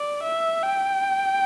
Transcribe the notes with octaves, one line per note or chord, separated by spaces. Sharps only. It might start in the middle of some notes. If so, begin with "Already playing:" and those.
Already playing: D5
E5
G5